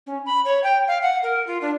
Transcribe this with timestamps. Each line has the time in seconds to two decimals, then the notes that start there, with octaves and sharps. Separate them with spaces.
0.07 C#4
0.26 B5
0.45 C#5
0.64 G5
0.88 F5
1.02 F#5
1.23 A#4
1.47 F4
1.61 D4